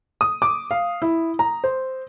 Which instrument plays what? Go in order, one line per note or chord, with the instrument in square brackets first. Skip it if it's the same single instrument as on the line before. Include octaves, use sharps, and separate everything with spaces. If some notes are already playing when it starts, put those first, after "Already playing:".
[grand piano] D#6
D6
F5
E4
A#5
C5